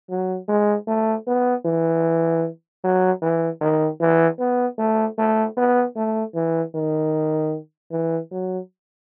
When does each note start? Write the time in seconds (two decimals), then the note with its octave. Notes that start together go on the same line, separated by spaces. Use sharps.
0.10 F#3
0.49 G#3
0.88 A3
1.27 B3
1.65 E3
2.84 F#3
3.22 E3
3.61 D#3
4.01 E3
4.39 B3
4.79 A3
5.18 A3
5.57 B3
5.96 A3
6.35 E3
6.75 D#3
7.92 E3
8.31 F#3